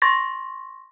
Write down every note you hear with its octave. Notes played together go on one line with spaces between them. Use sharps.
C6 C#6 A6 A#6